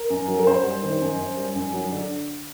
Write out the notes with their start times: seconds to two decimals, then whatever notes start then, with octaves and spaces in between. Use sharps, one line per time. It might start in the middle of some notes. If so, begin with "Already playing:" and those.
Already playing: A#4
0.10 F#2
0.28 F#3
0.39 A#4
0.47 F#2 C5
0.64 G3
0.83 D#3
1.01 F#2
1.19 F#2
1.37 G3
1.55 F#2
1.74 F#3
1.92 D3